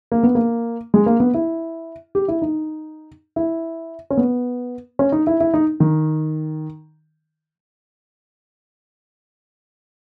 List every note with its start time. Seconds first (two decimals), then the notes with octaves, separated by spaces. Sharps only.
0.12 A#3
0.23 B3
0.35 A#3
0.94 G#3
1.06 A#3
1.20 B3
1.34 E4
2.15 G4
2.28 E4
2.42 D#4
3.36 E4
4.10 C#4
4.17 B3
4.99 C#4
5.12 D#4
5.27 E4
5.40 E4
5.54 D#4
5.80 D#3